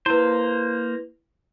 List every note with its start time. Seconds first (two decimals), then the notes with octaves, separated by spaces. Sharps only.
0.06 A#3 E4 B4 C5